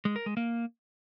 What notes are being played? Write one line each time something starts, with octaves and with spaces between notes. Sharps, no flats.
G#3
A#4
G#3
A#3